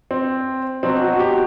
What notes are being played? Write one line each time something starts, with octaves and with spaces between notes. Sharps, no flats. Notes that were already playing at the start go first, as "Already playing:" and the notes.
C4
B2 F#3 C4
F#4
F#4
G4